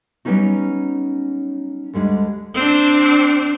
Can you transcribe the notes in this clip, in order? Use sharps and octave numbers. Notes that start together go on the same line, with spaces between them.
F#3 G3 B3 C#4 D#4 F#4
D2 D3 G3 G#3
C4 D4